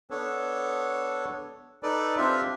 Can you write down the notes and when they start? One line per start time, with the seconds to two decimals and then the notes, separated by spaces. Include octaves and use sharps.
0.10 B3 D4 A4 C#5
1.83 D#4 A4 B4 D5
2.17 C4 D4 F4 G4 E5